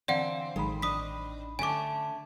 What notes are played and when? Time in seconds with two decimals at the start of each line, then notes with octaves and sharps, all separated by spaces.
0.08 D3 E3 C4 D5 F5 F#5
0.56 A1 D#3 G#3 B5
0.82 D4 D#5 D#6 B6
1.59 D3 A3 C#4 G#5 D6